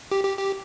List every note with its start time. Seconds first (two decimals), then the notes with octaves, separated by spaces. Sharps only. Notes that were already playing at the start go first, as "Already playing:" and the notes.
0.11 G4
0.24 G4
0.38 G4